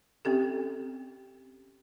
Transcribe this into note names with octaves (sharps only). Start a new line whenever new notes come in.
C4 C#4 G4 A4